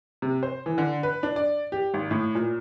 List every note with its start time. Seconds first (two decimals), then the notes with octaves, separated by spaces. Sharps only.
0.22 C3
0.43 C5
0.66 E3
0.78 D3
1.03 B4
1.23 D4
1.36 D5
1.72 G4
1.94 G#1
2.11 A2
2.35 A#2